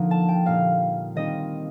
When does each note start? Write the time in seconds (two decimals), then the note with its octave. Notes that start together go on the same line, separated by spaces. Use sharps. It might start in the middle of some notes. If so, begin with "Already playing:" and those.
Already playing: D3 F3 A#3 D#4
0.11 A5
0.28 G5
0.46 A#2 G3 A#3 D#4 F5
1.15 D#3 G3 C4 D#4 D#5